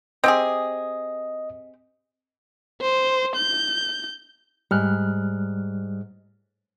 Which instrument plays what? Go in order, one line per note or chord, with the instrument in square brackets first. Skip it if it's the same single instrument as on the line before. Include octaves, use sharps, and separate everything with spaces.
[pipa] C4 G4 G#4 [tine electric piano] D#5
[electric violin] C5
G6
[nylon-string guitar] G#2 [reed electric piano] G3 F6 F#6